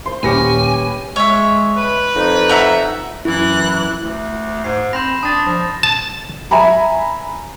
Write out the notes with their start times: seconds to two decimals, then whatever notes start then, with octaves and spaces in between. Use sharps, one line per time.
0.06 C5 C6
0.23 D#1 C#4 G4 B4 G#5 A#6 C#7
1.16 G#3 C#5 E5
1.77 B4
2.16 F2 D#4
2.49 E5 F#5 A#5
3.25 F#2 E3 E4 F#6
4.01 D2
4.64 G#2 C7
4.93 C4 B5 C6 G6 A#6 E7
5.23 D4 A5 D#6 A6 A#6
5.46 F3
5.83 A5
6.51 E5 G#5 A#5 B5